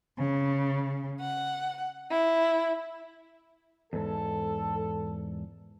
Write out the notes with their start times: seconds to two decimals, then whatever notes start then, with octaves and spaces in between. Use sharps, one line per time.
0.17 C#3
1.20 F#5
2.10 E4
3.93 E2 G#2 A4